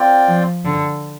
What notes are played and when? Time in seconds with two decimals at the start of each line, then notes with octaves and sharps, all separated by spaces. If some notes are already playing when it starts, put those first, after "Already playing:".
Already playing: C4 F4 D5 G5
0.28 F3
0.65 D3